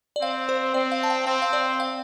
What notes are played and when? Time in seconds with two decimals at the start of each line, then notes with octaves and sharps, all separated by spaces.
0.16 D5
0.21 C4 F5
0.49 C5
0.74 C4 D5
0.92 F5
1.03 A5
1.10 G5
1.27 C4 G5
1.42 F5
1.53 D5
1.80 F5